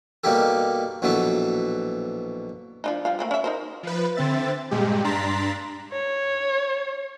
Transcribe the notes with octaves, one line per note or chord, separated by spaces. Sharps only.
B2 G3 A#3 D#4 G4 A4
A#1 B2 E3 F#3 B3 A4
F3 D4 D#4
F3 G3 F5
A3 A#3 C4
C#4 E5
D#4 A#4 C5
F3 B4
D3 C4 E5 A6
G2 A#2 G#3 G4
G2 D4 A#5 C6 A6 B6
C#5